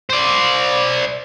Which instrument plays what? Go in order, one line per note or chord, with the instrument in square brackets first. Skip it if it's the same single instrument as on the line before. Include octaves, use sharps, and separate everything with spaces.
[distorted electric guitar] C5 D5